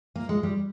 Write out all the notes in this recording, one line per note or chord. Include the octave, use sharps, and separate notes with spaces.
A#3
G#3
G3